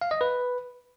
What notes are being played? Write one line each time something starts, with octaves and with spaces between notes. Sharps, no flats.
F5
D#5
B4